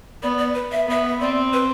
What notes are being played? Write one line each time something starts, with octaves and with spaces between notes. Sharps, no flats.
B3 D5
D5
B4
E5
B3 E5
E5
C4 D5
B4